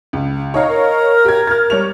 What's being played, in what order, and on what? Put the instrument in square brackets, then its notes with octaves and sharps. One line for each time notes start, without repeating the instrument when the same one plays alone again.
[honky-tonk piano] C#2
[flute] D#4 [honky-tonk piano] C#5 D#5 F5
[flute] A#4
[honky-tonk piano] G4 G#6
F6 A6
G3 C#5 F7